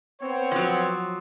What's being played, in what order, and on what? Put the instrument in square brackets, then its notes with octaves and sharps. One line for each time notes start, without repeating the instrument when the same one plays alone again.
[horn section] B3 C4 C#5
[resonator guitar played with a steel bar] F3 F#3